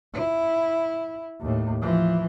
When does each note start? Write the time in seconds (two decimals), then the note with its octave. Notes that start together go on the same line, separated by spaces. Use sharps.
0.13 E4
1.40 D#2 A2
1.82 E3 F3